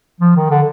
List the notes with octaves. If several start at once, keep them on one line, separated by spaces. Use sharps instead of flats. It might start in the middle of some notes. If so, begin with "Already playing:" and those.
F3
D#3
D3